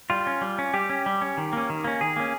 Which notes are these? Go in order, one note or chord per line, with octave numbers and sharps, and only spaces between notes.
G3 F4
C#4
G3
C#4
G3 G4
C#4
G3
C#4
D#3
A#3 C#4
D#3
A#3 C#4
D#3 G#4
A#3 C#4